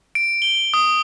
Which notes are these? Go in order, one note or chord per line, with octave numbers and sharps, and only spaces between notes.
D7
G7
D#6